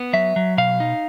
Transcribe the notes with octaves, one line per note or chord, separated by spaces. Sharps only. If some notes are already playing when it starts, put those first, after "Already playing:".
Already playing: B3
F#3 E5
F#3
B2 F5
D#4